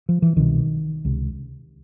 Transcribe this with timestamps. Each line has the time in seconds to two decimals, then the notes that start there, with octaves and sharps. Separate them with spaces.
0.09 F3
0.22 E3
0.36 C2 B2 D#3
1.05 C#2 C3